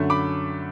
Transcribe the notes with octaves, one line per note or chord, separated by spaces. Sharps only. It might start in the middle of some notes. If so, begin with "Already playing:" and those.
Already playing: F#2 D3 A3
B5 D6